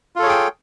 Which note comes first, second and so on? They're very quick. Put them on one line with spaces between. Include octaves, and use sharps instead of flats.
F4 A4 C#5 G#4 G5